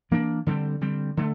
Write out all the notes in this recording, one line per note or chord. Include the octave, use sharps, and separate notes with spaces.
E3 A#3 D4
D3 G3 C4
D3 G3 C4
D3 A3